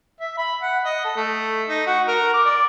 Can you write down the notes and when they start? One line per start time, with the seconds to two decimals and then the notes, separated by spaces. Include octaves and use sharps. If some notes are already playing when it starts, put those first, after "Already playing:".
0.20 E5
0.37 B5
0.62 F#5
0.85 D#5
1.04 A4
1.16 A3
1.69 D#4
1.87 F#4
2.08 A#4
2.34 D6
2.45 D5